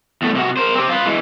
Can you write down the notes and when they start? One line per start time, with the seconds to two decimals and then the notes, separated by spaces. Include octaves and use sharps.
0.22 E2 A3
0.35 C3 F#4
0.57 A#4 C5
0.75 C4 G4
0.89 F4 B4
1.06 E3 G#3